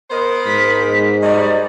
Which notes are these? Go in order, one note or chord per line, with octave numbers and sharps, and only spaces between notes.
B3 A#4 C5 D#5
G#2 B6
F#3 G3 D5 D#5